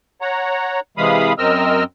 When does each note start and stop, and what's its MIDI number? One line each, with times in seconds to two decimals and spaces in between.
0.21 0.80 73
0.21 0.80 78
0.21 0.80 82
0.97 1.33 48
0.97 1.33 52
0.97 1.33 56
0.97 1.33 77
0.97 1.33 83
0.97 1.33 87
1.38 1.84 42
1.38 1.84 60
1.38 1.84 70
1.38 1.84 75
1.38 1.84 88
1.38 1.84 89